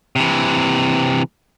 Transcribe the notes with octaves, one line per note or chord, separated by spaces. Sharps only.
C3 E3